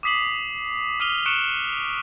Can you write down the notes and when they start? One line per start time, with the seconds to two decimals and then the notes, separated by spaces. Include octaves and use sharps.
0.03 D6 D#6 B6 C7 F#7
1.00 D#6 F6 D#7 F7 G7
1.26 C#6 F#6 C#7 D7 E7